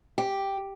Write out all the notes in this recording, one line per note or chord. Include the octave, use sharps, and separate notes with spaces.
G4